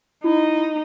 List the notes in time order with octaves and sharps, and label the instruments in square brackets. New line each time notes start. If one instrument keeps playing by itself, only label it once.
[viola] D#4 [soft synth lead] E4